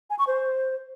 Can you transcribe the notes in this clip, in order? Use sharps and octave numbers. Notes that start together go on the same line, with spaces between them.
G#5
C#6
C5